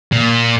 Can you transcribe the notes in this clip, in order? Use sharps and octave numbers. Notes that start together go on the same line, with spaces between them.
A#2